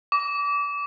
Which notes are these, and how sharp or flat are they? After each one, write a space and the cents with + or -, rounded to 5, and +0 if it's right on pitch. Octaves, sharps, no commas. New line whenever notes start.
D6 -30